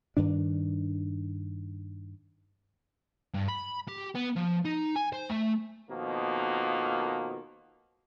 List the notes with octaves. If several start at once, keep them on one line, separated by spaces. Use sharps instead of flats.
G2 D#3 D4
G2
B5
G4
B3
F3
D#4
G#5
C5
A3
F2 B2 D#3 F3 A#3